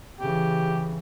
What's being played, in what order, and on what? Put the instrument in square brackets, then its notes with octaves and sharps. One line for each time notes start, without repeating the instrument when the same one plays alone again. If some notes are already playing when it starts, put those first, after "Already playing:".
[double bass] C#3 E3 [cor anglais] G4